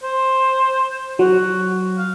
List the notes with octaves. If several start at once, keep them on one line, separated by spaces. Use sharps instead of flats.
C5
F#3 F#4
F5